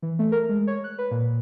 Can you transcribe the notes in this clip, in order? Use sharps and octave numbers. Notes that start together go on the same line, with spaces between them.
E3
A3
A#4
G#3
C#5
F#6
B4
A#2